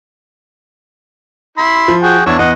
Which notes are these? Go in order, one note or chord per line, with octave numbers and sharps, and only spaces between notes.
E4 B5 C6
F3
F#4 G#4 G5
E2 D4 E4 C#5
E2 D#5 F#5